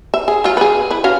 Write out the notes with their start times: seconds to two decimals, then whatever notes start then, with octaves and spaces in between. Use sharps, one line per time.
0.14 E5
0.28 G#4
0.44 F#3 F4
0.57 G#4 B4
0.90 E4 B4
1.04 C#4 F#4 F5